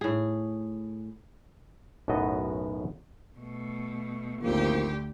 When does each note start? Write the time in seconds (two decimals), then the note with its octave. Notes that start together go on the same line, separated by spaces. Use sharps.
0.01 A2 G#4
2.08 B1 F#2 A2 B3 F#4 D#5
3.39 B2 A3
4.41 G#1 D2 F3 A#3 G4